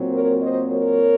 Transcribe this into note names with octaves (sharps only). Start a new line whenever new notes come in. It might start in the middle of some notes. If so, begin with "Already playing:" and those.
Already playing: A#2 F#3 C4
A#4 C#5
C5 D#5
A#4 C#5